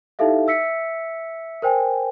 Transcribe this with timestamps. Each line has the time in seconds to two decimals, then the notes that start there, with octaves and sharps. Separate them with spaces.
0.19 D#4 E4 G4 A4 E5 F5
0.47 E5 E6 B6 C#7
1.62 A#4 C5 G5 G#5